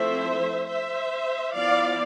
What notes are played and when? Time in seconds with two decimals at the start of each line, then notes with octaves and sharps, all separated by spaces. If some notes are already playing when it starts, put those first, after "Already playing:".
Already playing: F3 A3 C4 E4 C5 E5
0.68 C5 E5
1.54 F3 B3 E4 D5 F5